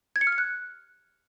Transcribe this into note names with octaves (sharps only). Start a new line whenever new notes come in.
G#6
C#7
F6
C#7
F#6